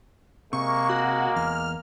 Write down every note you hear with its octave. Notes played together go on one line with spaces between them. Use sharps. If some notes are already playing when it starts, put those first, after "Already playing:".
C3 G#3 A#3 C#6
F#4
E2 F6